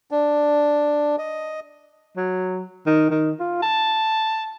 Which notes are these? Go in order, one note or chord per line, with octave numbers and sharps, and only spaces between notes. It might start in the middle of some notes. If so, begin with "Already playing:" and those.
D4
D#5
F#3
D#3
D#3
F4
A5